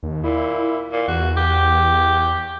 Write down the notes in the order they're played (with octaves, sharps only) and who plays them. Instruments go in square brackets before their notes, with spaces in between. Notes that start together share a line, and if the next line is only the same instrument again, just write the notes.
[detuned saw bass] D#2
[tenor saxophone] A#2 [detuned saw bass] E4
[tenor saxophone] A#2
[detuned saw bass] E2 [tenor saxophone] F#4
[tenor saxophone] G4